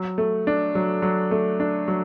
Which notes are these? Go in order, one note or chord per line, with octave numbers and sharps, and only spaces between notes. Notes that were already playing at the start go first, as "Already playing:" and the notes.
Already playing: F#3
A3
D4
F#3
F#3
A3
D4
F#3